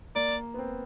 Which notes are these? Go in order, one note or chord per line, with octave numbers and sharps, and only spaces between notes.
A#3 D5
B3
C4